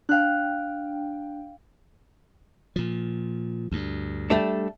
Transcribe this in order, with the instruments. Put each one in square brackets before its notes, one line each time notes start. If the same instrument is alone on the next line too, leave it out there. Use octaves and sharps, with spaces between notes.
[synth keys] D4 G5 [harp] F5 F#6
[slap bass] A#2 F3
D2 G2
[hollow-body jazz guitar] G3 A3 D4